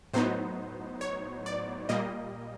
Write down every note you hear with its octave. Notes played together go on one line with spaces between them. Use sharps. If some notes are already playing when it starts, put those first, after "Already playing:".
A2 F#3 B3 D#4 C5
C#5
D5
A#2 G3 A#3 D#5